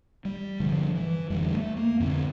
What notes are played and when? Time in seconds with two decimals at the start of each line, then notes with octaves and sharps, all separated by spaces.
0.25 G3
0.60 G2 D3 F3
0.95 E3
1.30 F2 D3 G3
1.53 A3
1.77 A#3
2.00 F2 D3 C4